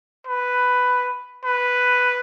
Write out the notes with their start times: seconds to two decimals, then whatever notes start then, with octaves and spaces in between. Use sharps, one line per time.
0.27 B4
1.44 B4